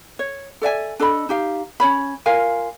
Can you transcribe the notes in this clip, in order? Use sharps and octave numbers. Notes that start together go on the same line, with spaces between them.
C#5
A4 D5 E5 G#5
D4 A4 D#5 B5
D#4 G4 F5
C#4 G#4 C#5 B5
F4 A#4 F5 G#5